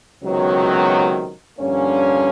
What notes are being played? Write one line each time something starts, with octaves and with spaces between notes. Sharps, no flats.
C#2 C3 D#3 F#3 B3
G2 D3 F3 A#3 C#4